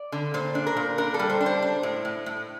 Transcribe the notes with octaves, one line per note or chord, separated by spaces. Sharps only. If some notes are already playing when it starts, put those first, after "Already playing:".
Already playing: D5
D3
A#2 C5
D4
A#4
A#2
D4 A#4
A4
G3
C5
D4
C5
D4
A2
A2
A2